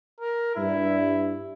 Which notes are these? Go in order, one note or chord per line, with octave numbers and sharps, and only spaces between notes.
A#4
G2 E4